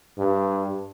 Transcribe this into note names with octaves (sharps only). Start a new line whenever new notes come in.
G2